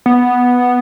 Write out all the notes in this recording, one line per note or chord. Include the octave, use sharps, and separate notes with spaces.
B3